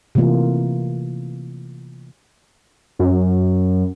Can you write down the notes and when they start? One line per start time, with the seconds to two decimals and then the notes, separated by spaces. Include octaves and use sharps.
0.15 C3 E3 A3 A#3 F4
2.99 F#2